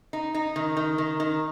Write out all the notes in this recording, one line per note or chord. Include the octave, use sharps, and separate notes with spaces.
D#4
D#4
D#3
D#3
D#3
D#3